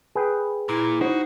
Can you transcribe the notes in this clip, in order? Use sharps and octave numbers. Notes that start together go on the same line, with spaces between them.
G#4 B4 G5
A#2 E4
D#4 F#4 C5